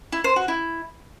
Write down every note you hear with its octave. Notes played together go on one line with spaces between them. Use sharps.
E4
C5
F#4
E4